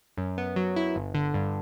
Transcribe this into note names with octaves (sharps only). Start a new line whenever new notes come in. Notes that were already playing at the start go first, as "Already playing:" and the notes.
F#2
B3
F#3
E4
G1
D3
G2